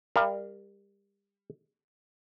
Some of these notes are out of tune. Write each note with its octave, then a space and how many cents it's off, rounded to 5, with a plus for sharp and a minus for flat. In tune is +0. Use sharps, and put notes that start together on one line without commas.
G3 +30 A#4 +0 F5 -30